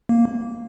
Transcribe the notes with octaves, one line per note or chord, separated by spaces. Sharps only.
A#3